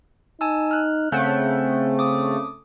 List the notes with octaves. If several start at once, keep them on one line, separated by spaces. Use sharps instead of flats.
D#4 G#5 A5 E6
F6 F#6
C#3 A3 C4 F#5 F#6 G6
D6 D#6